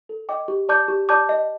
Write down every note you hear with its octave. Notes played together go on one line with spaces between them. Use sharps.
A4
D#5 G5 D6
G4
D5 A5 D6 G6
G4
D5 A5 D6 G6
D#5